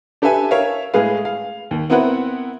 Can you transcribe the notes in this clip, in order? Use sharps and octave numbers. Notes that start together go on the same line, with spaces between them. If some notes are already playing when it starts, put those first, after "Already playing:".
D4 G4 A4 B4 E5 G#5
A#4 C#5 E5 F5
A2 G#3 G#4 B4 F5
F5
D#2
B3 C4 E4 A#4 B4 F#5